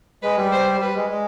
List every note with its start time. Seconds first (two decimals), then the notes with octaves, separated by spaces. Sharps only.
0.22 G#3 B4
0.37 G3
0.52 C5
0.81 G3 B4
0.96 G#3
1.10 G#3